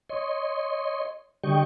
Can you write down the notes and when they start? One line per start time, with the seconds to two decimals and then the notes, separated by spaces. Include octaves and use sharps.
0.09 C#5 D#5 C6
1.44 D3 G3 G4 D#5 G5 C#6